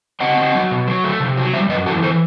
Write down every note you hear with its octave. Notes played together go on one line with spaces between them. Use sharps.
C4 D#5 F#5
C4
F#3
B2
F#3
A3
C3
F#3
G3 C5 E5
F#2 B4 D#5
E3 F#4 A4
E3 A4 C5